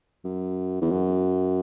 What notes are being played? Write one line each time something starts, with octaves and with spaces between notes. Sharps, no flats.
F#2
E2
F#2